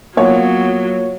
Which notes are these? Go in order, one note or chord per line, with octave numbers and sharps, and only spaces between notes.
F#3 A#3 B3 F4 C#5